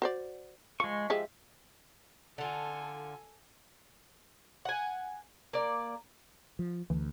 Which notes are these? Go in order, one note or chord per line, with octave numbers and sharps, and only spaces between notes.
F#4 C5 D5
F3 G#3 C#6
F3 G#3 G4 E5
D3 F4 A4 G#5
F#5 G#5
A#3 D5
F3
D2 E3